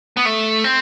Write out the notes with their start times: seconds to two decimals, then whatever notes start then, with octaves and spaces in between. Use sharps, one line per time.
0.17 B3
0.25 A3
0.64 C4